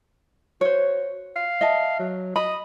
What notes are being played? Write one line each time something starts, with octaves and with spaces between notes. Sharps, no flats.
F#4 C5 C#5
F5
D#5 E5 A5
F#3
D#5 B5